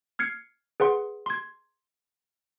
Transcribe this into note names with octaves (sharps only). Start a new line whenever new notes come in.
F6 G#6 C7 C#7
G#4 B4 F#5 C6
C6 G#6